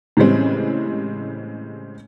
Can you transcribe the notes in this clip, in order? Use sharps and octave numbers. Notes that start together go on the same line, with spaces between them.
A2 C#3 E3 G3 G#3 C4